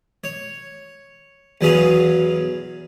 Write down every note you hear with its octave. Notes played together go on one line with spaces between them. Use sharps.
C#5
E2 F#3 B3 C#4 G#4 F5